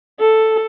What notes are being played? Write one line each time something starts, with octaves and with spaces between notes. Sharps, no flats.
A4